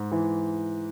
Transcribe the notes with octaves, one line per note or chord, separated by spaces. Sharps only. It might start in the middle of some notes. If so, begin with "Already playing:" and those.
Already playing: G#2
E3